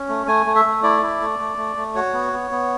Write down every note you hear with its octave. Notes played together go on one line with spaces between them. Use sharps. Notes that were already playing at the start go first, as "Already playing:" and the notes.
Already playing: C#4
A3
A3 G#5
A3
E5
A3
E4 D5
E4
A3
A3
A3
A3
F#4 C#5
B3
B3
B3